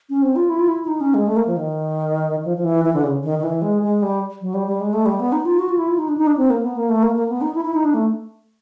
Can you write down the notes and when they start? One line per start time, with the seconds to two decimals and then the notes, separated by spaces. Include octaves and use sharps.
0.10 C#4
0.22 C4
0.36 F4
0.49 E4
0.59 F4
0.68 E4
0.84 E4
0.88 D#4
1.01 C#4
1.14 G#3
1.27 A3
1.37 A#3
1.47 F3
1.57 D#3
2.45 F3
2.57 F3
2.64 E3
2.84 E3
2.94 D3
3.04 C#3
3.23 D#3
3.39 D#3
3.44 E3
3.62 G#3
3.82 G#3
4.02 G3
4.41 F#3
4.54 G3
4.67 G3
4.80 G#3
4.93 A3
5.06 G3
5.20 B3
5.32 D#4
5.45 F4
5.59 F#4
5.69 F4
5.78 E4
5.88 F4
5.98 D#4
6.08 D4
6.18 D#4
6.27 D4
6.37 C4
6.50 A#3
6.63 B3
6.77 A#3
6.89 A3
7.03 A#3
7.16 A#3
7.29 B3
7.41 D#4
7.55 E4
7.65 E4
7.74 D#4
7.85 D4
7.94 A3